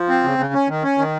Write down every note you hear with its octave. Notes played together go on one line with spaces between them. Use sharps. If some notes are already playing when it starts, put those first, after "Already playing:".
Already playing: F3
C4
C#3
C#3
C#4
D#3
C#4
D#3